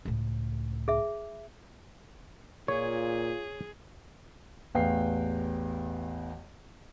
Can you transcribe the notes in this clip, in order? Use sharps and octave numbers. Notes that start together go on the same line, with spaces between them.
C#2 A2
G#4 E5
A#2 F4 G#4 C#5
A1 E2 B4 F5 G5 C7